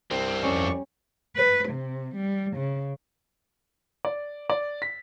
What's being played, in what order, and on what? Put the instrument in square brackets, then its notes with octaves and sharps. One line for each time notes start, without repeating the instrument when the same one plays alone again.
[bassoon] C2 [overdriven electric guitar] G2 C4
[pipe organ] F2 D5 C#6 [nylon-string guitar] G3 C#4
[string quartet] B4
C3
G3
C#3
[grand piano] D5
D5
B6